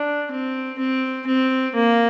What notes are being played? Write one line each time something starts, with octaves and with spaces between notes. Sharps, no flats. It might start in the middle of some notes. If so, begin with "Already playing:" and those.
Already playing: D4
C4
C4
C4
A#3